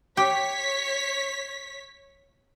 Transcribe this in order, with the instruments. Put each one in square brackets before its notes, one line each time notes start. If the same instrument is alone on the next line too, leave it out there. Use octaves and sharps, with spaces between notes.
[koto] G4 [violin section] C#5 B6